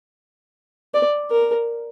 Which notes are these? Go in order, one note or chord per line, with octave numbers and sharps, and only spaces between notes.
D5
A#4